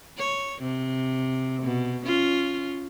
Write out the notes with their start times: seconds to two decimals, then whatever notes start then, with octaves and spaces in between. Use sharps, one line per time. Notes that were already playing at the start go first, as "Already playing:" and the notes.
0.18 C#5
0.62 C3
1.63 B2
2.06 C#4 F4